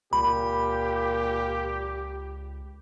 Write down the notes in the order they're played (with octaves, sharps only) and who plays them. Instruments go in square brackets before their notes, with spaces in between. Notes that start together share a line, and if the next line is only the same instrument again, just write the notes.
[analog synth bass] C#2 [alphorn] A#2 [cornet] G4 [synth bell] B5